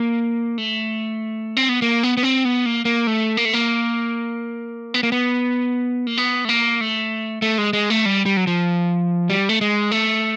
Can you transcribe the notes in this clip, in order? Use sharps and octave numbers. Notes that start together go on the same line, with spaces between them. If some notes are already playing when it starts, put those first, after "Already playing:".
Already playing: A#3
A3
C4
B3
A#3
B3
B3
C4
B3
A#3
A#3
A3
A#3
A3
A#3
B3
A#3
B3
A#3
B3
A3
A#3
A3
A3
G#3
G#3
A3
G3
G3
F#3
F3
G3
A3
G#3
A3